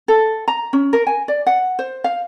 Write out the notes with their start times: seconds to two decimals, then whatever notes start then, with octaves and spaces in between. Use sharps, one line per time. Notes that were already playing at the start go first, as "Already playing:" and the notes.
0.08 A4
0.48 A#5
0.73 C#4
0.93 A#4
1.07 G#5
1.28 D5
1.47 F#5
1.79 C5
2.04 F5